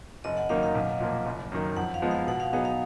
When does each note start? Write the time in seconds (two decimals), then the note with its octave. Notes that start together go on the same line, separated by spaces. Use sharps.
0.24 F#1 D#5
0.37 F#5
0.49 F#2 D#3 A#3 D#4 F5
0.63 F5
0.75 B1
1.00 A#2 F3 A#3
1.26 F#1
1.52 F#2 D#3
1.76 F2 F#5
1.94 F5
2.02 F3 G#3 B3 D#4
2.11 F5
2.27 B2 F#5
2.40 F5
2.53 F#3 B3 D#4 G#4 F5
2.65 F5